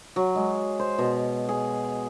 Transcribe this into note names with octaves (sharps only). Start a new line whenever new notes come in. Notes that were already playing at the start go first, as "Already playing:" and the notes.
F#3
G#3
C5
B2
G#4